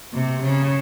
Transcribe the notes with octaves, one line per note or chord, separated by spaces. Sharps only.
C3
C#3